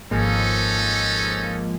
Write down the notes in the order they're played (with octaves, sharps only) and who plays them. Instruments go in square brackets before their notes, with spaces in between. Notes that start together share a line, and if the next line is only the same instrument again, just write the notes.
[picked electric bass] G#1 [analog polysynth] F3 G#3 A#3 [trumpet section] C#4 D#4 A4